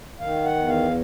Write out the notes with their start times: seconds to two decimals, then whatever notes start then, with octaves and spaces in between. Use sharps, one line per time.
0.20 D#3 F5
0.44 F#5
0.56 E2
0.68 F5